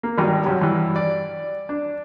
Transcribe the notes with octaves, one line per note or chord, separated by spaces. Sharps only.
A#3
G#1 G2 D#3
F#2 C3 F#3
G2 E3
D5
D4